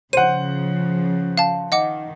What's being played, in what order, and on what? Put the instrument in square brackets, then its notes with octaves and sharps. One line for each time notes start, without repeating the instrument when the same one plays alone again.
[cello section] C#3 F3 [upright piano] C5 F#5 [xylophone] D#7
[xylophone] F5 A5
[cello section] D#3 [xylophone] D#5 F#5 D6